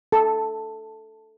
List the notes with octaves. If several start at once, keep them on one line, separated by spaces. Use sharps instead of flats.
A4